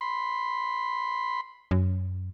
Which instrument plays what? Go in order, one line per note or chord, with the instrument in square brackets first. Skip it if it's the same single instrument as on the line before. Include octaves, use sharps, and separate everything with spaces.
[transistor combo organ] B5 C6
[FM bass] F#2